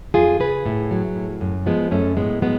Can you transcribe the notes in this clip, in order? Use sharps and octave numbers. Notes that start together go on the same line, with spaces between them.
F2 F4 G#4
C#3 G#4 B4
A2
F#3
A2
F#2
F3 G#3 B3
F#2 A3 C#4
A2 G#3 B3
F#3 G#3 B3